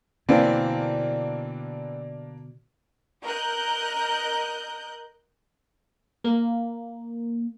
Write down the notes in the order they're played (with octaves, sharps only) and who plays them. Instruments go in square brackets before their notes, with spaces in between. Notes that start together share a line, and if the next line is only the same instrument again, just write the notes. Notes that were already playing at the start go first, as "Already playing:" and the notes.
[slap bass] B2 D3 [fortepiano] E3 C4 [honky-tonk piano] A#3 D4
[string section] A#4 D#5 F#6 G6
[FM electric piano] A#3